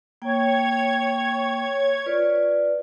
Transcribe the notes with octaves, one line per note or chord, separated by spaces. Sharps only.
A#3 C#5 G5 G#6
F4 B4 D5